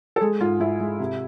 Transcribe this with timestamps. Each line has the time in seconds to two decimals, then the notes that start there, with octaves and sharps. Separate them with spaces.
0.16 A4
0.21 G#3 G#4
0.40 G#2 F4
0.60 G#2 E4
0.80 G#3
1.00 C3